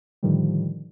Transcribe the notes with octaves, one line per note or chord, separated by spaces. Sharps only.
A2 D3 D#3 F3 G3